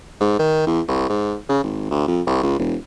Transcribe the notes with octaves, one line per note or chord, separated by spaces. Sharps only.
G#2
D#3
E2
C2
G#2
C#3
G#1
D2
F2
C2
C#2
E1